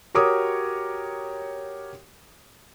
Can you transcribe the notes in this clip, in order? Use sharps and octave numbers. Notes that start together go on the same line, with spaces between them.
F#4 G4 A#4 C#5 D6 D#6